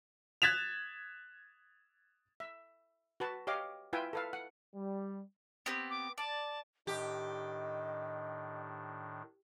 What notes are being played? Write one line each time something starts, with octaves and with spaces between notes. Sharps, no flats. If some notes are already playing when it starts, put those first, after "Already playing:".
F#6 G#6 A6 B6 E7 F7
E5
F#4 B4 A5
G4 C#5 D#5 F5 D6
E4 F4 B4 E5 G5 G#5
A4 B4 F5
F#5
G3
B3 C4 G4
D6
D5 A5
A2 D#3 D4 G4 D#5